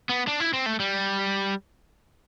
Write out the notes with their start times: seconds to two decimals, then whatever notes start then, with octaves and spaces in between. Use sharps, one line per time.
0.09 B3
0.28 D4
0.40 E4
0.53 C4
0.66 A3
0.80 G3